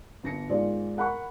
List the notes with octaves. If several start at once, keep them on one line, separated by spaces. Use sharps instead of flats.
G1 A#6 C#7
G#2 D#3 G#3 F4 C5 D5
A#4 F#5 B5 C#6